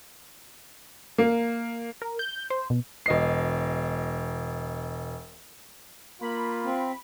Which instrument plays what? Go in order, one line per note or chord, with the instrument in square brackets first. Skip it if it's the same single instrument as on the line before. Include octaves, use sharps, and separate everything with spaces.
[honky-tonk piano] A#3
[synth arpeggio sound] A#4
G6
C5
B2
[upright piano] E1 D#5 C7
[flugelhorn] A#3 [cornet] F4 [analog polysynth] B5
[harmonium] C4